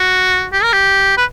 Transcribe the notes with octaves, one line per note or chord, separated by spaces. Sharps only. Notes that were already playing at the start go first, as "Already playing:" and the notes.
Already playing: F#4
G4
A#4
G4
B4